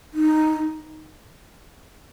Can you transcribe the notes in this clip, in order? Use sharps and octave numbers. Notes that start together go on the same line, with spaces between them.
D#4